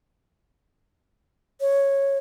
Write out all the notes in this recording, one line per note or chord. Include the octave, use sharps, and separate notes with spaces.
C#5